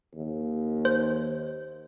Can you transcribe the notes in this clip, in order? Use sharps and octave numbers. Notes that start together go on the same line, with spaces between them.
D#2
C5